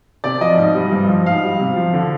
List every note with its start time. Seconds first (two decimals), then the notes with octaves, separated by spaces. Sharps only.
0.24 C3 D5
0.41 F3 D#5
0.58 G#2
0.74 G3
0.92 G2
1.09 F3
1.26 G#2 F5
1.43 G3
1.60 C3
1.76 F3
1.94 D3